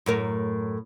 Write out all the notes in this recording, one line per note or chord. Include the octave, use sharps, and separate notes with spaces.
F#2 A2 A#4